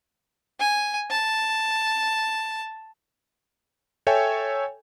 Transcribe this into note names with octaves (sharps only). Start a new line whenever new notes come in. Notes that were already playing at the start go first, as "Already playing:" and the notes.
G#5
A5
A4 C#5 E5 G5 G#5